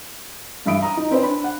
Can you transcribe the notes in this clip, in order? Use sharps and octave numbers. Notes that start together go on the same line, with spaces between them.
G2 E3 E5 B5 D#6 D7
A#5 D#6
D#4
C4 C#4 B4 C5
D4 B5
F#5